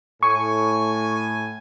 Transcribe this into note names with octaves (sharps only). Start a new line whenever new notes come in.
A2 G#5 C#6